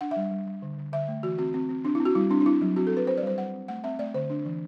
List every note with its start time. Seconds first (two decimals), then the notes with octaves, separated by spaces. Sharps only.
0.01 D4 F#5
0.11 E5
0.16 G3
0.31 G3
0.47 G3
0.62 D3
0.78 D3
0.92 D3 E5
1.08 A3
1.23 E3 F#4
1.38 C4 F#4
1.54 C4
1.69 C4
1.85 C4 D4
1.95 E4
2.00 C4
2.05 F#4
2.15 G3 E4
2.30 C4 D4
2.41 D4
2.46 C4 E4
2.62 F#3
2.76 C4 F#4
2.87 A4
2.92 C4 B4
3.07 C4 C5
3.17 D5
3.23 G3 C5
3.38 G3 F#5
3.53 C4
3.68 A3 F#5
3.84 C4 E5
3.99 A3 D5
4.14 D3 C5
4.30 D4
4.45 E3